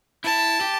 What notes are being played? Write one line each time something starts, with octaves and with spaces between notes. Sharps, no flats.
E4 A5
G4